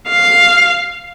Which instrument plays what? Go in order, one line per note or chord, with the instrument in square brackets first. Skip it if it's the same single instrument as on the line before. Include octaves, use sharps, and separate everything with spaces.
[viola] F5